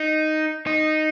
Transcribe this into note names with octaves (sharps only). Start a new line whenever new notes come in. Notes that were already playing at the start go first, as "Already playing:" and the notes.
Already playing: D#4
D#4